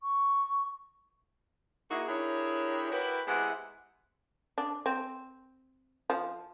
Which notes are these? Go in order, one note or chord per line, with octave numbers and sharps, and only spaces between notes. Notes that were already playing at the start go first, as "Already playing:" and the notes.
C#6
A#3 D#4 E4 F#4 G#4
D4 E4 G4 G#4 A#4 C#5
E4 F#4 G4 A#4 B4
C3 G#3 B3 E4 E5 F#5
D4
C4
F3